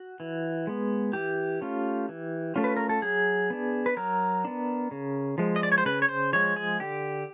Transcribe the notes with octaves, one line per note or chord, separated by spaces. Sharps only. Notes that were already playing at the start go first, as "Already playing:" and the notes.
Already playing: F#4
E3
G#3 B3
E3 G4
A3 C#4 F4
E3
A3 C#4 F4
B4
A#4
A4
F#3 G#4
B3 D4
B4
F#3 A#4
B3 D4
C#3
F3 G#3
D#5
D5
C#5
C5
C#3 B4
C#5
C5
F3 G#3 C#5
G#4
D3 G4